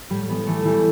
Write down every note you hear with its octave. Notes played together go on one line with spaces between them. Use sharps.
A2 G3
E3 B3
E3 A3
E3 G3